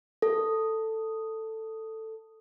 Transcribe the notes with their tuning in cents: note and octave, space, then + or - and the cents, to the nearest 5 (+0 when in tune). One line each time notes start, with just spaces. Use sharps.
A4 +10